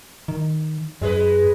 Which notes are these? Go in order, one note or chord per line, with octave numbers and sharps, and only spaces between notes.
D#3
F#2 G#3 G#4 B4